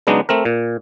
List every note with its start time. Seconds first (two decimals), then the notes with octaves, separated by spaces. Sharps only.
0.07 C#3 F#3 G#3 B3 D4 D#4
0.29 A3 C4 A#4
0.45 A#2